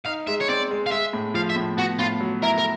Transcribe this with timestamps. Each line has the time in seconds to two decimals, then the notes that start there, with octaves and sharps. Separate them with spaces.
0.06 D#4 F5
0.27 G#3 E5
0.41 C#5
0.49 C4 D5
0.71 G#3
0.86 F5
0.91 G#3 E5
1.13 A2
1.34 F3 F5
1.50 E5
1.56 A2
1.77 B3 F#4
1.99 A2 F4
2.21 F#3
2.42 E4 A#4
2.58 A#4